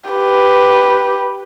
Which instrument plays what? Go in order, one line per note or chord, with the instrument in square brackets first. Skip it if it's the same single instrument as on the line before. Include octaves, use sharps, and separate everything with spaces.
[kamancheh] G4 B4